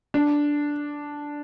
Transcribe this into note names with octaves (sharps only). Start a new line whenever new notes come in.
D4